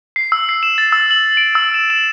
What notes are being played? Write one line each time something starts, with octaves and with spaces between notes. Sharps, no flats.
C7
E6
C7
E7
A6
E6
F#7
D7
E6
E7
E7